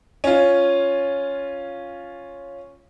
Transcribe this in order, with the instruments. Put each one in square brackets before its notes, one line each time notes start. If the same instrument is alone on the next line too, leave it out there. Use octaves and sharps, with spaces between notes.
[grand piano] C#4 F4